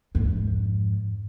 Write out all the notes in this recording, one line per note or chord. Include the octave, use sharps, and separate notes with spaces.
F2 G#2